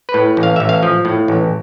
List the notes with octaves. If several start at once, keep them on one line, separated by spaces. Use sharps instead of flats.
B4
A2
A1
F5
A1 E5
F5
F3
A2
A1